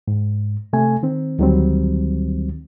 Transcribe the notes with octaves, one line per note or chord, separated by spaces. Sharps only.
G#2
C3 A3 G#5
D#3 C4
D2 D#3 F#3 G3 C4